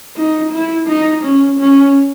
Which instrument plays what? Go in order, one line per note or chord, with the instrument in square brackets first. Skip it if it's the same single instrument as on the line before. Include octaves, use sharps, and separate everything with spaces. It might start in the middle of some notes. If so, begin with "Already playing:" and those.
[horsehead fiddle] D#4
E4
D#4
C#4
C#4